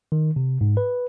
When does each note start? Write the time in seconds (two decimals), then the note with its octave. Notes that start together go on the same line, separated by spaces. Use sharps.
0.12 D#3
0.36 C3
0.61 G#2
0.77 B4